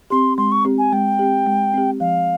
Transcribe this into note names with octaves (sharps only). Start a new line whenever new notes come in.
C4 G4 C6
G#3 C6
C#6
C4 G4
G#5
G#3 G5
C4 G4
G#3
C4 G4
F3 F5